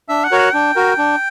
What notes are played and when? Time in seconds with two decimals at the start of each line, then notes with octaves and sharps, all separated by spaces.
0.09 D4 E5
0.24 F#5
0.31 F#4 A#4 C#5
0.39 F#5
0.54 D4 G5
0.76 F#4 A#4
0.98 D4